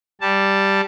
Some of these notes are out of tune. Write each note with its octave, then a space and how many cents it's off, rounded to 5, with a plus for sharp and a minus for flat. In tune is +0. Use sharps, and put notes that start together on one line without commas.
G3 +0 A5 +5